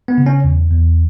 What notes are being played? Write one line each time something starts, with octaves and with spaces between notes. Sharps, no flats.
B3
C#3
C#4
E2
E2